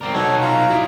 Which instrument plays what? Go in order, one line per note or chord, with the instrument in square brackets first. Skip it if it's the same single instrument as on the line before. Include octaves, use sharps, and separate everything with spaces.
[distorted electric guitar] C4 A#4 [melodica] D5
[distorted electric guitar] F#3 D#4 [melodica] A4 C#5
[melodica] F4 F5 A#5
[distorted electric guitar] E4 D5